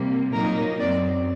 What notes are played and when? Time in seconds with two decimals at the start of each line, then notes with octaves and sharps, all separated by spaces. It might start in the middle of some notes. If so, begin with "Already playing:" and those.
Already playing: C3 G3 A#3
0.33 A#2 F#3 A#3 D#4 A#4
0.79 F#2 F#3 C4 D5